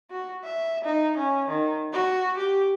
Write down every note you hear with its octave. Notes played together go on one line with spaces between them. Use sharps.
F#4
E5
D#4
C#4
D#3
F#4
G4